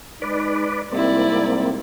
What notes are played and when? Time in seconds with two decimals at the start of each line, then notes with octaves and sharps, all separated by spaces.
0.22 G#3 D#4 B4 D5
0.92 G#2 C3 G3 A#3 C4 E4 D5